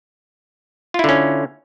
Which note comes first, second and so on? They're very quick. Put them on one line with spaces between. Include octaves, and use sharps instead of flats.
F4 E4 D3 C#4